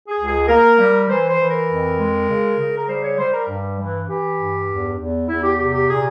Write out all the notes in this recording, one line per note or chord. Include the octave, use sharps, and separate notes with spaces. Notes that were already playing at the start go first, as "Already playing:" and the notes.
G#4
C#2
G#4
A#3 A#4
G3
E3 C5
C5
E3
A#4
F2
G#3
C#3
C#3
A#4
G3 C5
C#5
G3 C5
A#4
G2
E3
E3 G4
G2
E2
E2
E2 E4
G4
C3 G4
G4
A#2 G#4